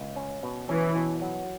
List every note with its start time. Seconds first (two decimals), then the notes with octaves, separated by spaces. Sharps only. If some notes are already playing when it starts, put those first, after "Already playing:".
Already playing: C#2
0.16 C#4
0.43 B2
0.69 E3 C#4
0.96 B2
1.22 F#3